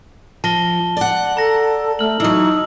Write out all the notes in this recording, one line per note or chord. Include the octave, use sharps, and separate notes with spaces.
F3 A5 A#6 G7
D5 F#5
A4 A#5 A#6
A3 F6 F#7
E3 F#3 D#4 E6